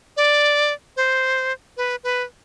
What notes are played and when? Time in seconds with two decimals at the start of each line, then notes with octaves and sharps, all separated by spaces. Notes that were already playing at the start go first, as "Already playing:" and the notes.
0.17 D5
0.97 C5
1.77 B4
2.04 B4